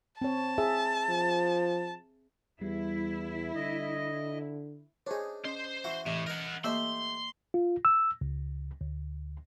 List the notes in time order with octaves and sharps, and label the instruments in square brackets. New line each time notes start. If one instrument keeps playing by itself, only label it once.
[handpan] C4 C#5 [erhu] A5
[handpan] G#4 E5
[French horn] F3
[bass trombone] E2 [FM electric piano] G3 [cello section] E4
[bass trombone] D3 [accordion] D#5
[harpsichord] D4 D#4 [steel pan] G#4 C5 C#5
[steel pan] C#4 D#5 [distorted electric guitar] C5
[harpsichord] E3 E4 F#4
[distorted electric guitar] A2 [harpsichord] C3 [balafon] E3
[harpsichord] D#4 B4 [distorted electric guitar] A#4 F#5
[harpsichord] A3 G4 C5 [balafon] A#3 [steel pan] D#5 E6 [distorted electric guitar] C6
[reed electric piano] F4
E6
C#2
D2